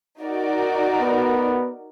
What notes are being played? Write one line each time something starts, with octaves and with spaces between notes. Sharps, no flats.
D#4 F#4 A#4 D5
B3